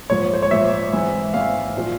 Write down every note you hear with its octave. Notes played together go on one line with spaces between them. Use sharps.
A#1 G#2 F3 C#5
C5
C#5
A#1 G#2 F3 E5
G#1 G#2 E3
G#1 G#2 E3 F5
A#2 F3